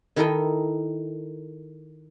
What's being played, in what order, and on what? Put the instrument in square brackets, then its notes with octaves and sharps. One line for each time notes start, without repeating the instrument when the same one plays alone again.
[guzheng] D#3 E4 A4 A#4 D#5 G5